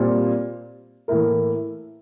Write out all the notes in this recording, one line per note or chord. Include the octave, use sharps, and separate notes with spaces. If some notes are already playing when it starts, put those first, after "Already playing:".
Already playing: A#2 G3 C4 F4
A2 E3 A#3 E4 A#4